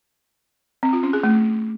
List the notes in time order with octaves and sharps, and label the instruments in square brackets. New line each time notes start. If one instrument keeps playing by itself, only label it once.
[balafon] C4
F4
C#4
G#4
A3